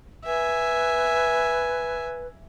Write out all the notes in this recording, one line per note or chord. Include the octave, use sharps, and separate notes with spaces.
B4 E5 G#5